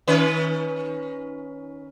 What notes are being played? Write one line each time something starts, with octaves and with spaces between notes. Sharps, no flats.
D#3 C#4 B4